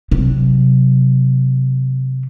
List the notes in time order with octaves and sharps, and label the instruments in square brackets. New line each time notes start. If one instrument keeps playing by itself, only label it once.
[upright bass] C3 F#3